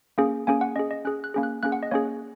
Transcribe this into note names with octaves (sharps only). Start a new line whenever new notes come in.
A#3 C#4 G#4
A#3 C#4 G#4 G#5
F#5
C#4 G#4 D#5
D#5
C#4 G#4 F#6
F#6
A#3 C#4 G#4
F#6
A#3 C#4 G#4 F#6
F#5
D#5
A#3 C#4 G#4 C#5